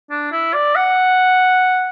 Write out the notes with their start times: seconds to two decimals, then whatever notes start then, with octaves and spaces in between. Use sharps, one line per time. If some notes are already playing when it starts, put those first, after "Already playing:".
0.11 D4
0.32 E4
0.54 D5
0.76 F#5